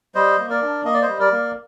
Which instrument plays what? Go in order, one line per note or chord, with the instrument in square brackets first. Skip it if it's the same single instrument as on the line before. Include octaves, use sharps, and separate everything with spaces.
[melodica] G3 C5 D#5
A#3
A#4 D5
D4
A#3 D#5
D5
C5 D#5
G3
A#4 D5
A#3